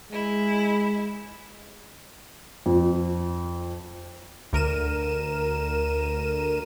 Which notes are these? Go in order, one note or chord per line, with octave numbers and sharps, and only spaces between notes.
G#3 E4
F2
D2 A#4 D#7 E7